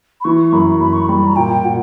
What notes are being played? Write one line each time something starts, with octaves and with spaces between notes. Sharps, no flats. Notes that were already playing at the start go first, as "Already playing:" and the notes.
B5
E3 C#6
F#2 B5
F#2 B5
C#6
G3 B5
A#5
A#2 G5
A#2 F#5